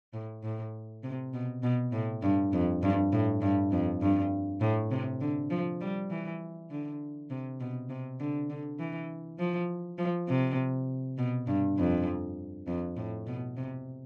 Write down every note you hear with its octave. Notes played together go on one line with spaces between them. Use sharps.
A2
A2
C3
B2
B2
A2
G2
F2
G2
A2
G2
F2
G2
A2
C3
D3
F3
G3
E3
D3
C3
B2
C3
D3
D3
E3
F3
F3
C3
B2
G2
F2
F2
A2
B2
C3